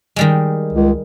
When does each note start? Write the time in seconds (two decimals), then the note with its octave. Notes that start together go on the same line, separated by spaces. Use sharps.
0.16 D#3 G3 G#3
0.73 C#2